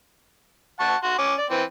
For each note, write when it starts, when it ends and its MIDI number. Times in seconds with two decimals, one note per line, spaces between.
0.80 0.96 78
0.80 0.96 81
0.80 0.96 85
1.03 1.17 66
1.03 1.17 84
1.18 1.34 61
1.18 1.34 86
1.38 1.45 74
1.50 1.63 52
1.50 1.63 60